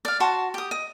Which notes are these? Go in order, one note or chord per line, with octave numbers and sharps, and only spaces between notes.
D5 F5
F#4 A5 C6
G4 D#6
D#5